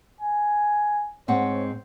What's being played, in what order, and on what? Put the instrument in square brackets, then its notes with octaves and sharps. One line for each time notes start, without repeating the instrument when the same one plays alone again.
[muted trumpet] G#5
[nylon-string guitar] G#2 C4 F#5 [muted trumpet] C#5